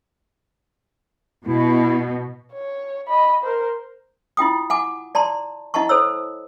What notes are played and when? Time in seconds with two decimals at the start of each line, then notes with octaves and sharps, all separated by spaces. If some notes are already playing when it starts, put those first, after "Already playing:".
1.45 B2 E4
2.53 C#5
3.08 D#5 B5
3.43 A#4 C5
4.37 E4 F4 G5 D#6
4.70 F#5 G#5 D6
5.15 D5 A5 A#5 C6
5.74 E4 D#5 F#5 A5 C#6
5.89 A4 C5 C#5 E6